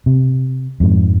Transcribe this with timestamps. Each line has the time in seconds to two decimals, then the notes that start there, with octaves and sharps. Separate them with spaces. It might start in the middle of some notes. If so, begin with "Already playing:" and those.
0.06 C3
0.80 F2 G#2